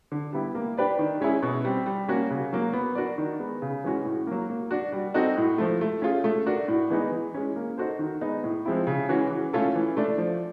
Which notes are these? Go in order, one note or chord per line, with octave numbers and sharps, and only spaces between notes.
D3
G3 B3 E4 G4
A#3
D4 G4 B4 D5
D#3
G#3 C#4 E4 G#4
B2
G3 C4
G3
A#3 C#4 F#4
C#3
F#3 A#3
B3
D4 F#4 A#4 D5
D#3
G#3 B3
C#3
E3 G#3 C#4 F#4
A2
F#3 A#3
A#3
D4 F#4
G3
C4 D#4 F#4 A4
A2
F3 A3
A3
C#4 F4 G#4
A3
D4 F#4 A#4
A2
E3 G#3 B3 D#4
E3
G#3 C#4
A#3
D#4 F#4 A4 C5
D#3
G#3 B3 D#4
A2
F3 G#3 C4 E4
C#3
E3 G#3 C#4 F#4
E3
A3 C#4 F4 A4
E3
A3 D4
F3